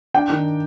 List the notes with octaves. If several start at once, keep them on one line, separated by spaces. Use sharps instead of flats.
D4 G5
D#3